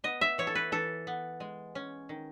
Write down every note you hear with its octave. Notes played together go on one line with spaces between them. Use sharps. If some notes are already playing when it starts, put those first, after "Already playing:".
B3 D#5
E5
E3 C#5
A4
B4
E3 A4
B3
G#3
C#4
D#3